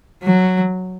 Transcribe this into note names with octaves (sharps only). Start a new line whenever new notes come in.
F#3